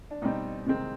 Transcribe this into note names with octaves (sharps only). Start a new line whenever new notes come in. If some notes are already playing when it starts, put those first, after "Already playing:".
D4
B2 G3 C4 D#4
C3 D#3 G#3 C4